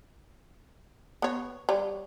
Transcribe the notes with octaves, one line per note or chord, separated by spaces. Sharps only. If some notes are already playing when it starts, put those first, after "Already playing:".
B3 C#5
G3 C#5